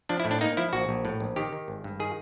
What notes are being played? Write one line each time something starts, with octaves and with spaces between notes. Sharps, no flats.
F3 D4
E4
A2
D4
A#3 D#4
F3 E4
A#1 F#4
A#1
A2
A#1
D#3 G4
D#3
G#1
G2
D#3 G#4